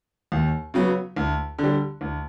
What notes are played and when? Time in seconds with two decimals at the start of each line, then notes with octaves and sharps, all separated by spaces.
0.32 D#2
0.74 C#3 F#3 B3
1.16 D2
1.59 D3 G3
2.01 D2